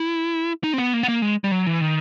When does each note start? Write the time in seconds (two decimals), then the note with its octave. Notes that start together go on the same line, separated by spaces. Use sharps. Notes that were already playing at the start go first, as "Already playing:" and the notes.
Already playing: E4
0.64 D#4
0.74 C4
0.78 B3
0.93 A#3
1.03 B3
1.08 A#3
1.22 G#3
1.44 G3
1.51 F#3
1.67 E3
1.81 D#3